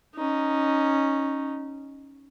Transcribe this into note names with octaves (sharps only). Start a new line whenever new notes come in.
C#4 D#4